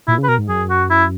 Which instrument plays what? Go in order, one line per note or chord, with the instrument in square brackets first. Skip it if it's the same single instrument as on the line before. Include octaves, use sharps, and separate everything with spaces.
[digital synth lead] A#2 [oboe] E4
[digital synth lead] C#3
[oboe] B4
[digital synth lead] B2 [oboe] A#4
[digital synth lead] G#2
[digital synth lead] F#2 [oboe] G#4
[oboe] F#4
E4